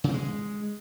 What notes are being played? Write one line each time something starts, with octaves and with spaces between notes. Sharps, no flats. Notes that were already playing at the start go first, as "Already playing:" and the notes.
C#3
C4
G#3